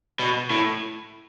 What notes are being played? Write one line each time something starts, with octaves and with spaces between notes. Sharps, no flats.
B2
A2